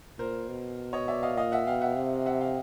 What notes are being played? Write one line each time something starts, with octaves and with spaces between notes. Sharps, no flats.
A#2 A#4 C5
B2
C#5 D#5
D5 E5
D#5 F5
A#2 D#5 F5
E5 F#5
B2 F5 G5
E5 F#5
C3
E5 F#5
F5 G5